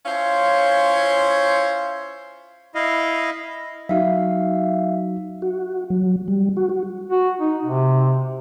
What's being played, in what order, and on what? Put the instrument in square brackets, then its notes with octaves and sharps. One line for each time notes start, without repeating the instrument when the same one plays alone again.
[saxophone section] C#4 E4 F4 C5 C#5 F5
[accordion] E4 D#5 F5
[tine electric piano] F#3 D#4 F#4 [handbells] E5 F5
[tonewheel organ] F#4
F#3
G3
F#4
F#4
[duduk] F#4
D#4
C3